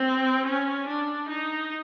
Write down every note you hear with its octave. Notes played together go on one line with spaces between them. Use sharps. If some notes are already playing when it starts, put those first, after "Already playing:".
Already playing: C4
C#4
D4
D#4